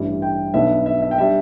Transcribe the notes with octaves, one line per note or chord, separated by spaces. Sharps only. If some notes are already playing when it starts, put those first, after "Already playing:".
Already playing: A1 G2 G3 E4
G5
B1 B2 B3 D4 E5
E5
E5
G5
G3 D4 E5